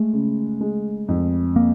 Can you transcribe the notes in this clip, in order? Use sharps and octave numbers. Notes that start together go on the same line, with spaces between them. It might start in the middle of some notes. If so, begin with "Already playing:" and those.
Already playing: G#3 A3
C#3
G#3
F2
A#3